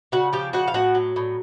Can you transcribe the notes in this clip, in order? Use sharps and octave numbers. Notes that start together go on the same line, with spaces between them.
C#3 F#4 F#5
F3 G4 G5
C#3 F#4 F#5
F5
A2 F#4 F#5
F#3
A2